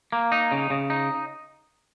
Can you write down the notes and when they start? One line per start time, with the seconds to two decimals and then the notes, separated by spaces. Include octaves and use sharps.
0.12 A#3
0.32 D#4
0.52 C#3
0.70 C#3
0.90 D#4